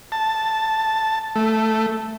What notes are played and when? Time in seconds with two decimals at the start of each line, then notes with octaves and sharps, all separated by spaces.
0.12 A5
1.36 A3